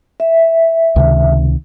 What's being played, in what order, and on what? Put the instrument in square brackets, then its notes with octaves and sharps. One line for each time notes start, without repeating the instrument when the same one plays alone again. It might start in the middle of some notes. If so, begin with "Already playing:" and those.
[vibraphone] E5
[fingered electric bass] C#2 C3 D#3